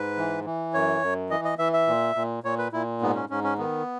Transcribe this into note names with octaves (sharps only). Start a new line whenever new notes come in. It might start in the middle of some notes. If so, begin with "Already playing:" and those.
Already playing: G#2 B4
E3
E3
F#2 C#5
F#2
E3 D#5
D#5
E3 E5
E5
A#2
A#2
A#2 C#5
B4
A#2 E4
G#2 B3
C#4
G#2 C#4
C#4
D#3 B3